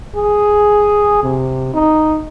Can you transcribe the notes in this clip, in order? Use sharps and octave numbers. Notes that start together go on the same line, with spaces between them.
G#4
C3
D#4